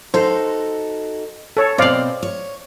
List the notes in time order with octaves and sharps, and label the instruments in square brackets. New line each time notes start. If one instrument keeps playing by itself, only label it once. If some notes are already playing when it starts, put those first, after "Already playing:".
[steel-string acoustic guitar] D#4 F#4 A4 [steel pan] C5
[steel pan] A4 C#5
[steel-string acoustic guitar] B2 C4 [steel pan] C5 D5 F5
[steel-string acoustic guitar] C#5